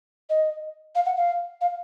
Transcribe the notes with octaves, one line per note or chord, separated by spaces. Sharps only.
D#5
F5
F#5
F5
F5